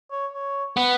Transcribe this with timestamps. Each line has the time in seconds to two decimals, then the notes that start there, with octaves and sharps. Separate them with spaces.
0.11 C#5
0.33 C#5
0.77 B3 B4